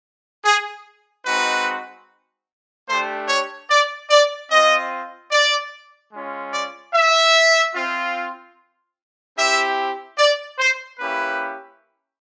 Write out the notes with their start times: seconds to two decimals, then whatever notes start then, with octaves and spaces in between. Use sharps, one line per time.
0.45 G#4
1.25 G#3 C4 D#4 F#4 B4
2.88 A3 D4 G4 C5
3.28 C#5
3.69 D5
4.10 D5
4.51 C4 F4 D#5
5.32 D5
6.12 G#3 C#4 F4
6.53 D5
6.94 E5
7.75 C4 F4
9.37 C4 E4 G4 E5
10.18 D5
10.58 C5
10.99 A#3 C#4 E4 G4 B4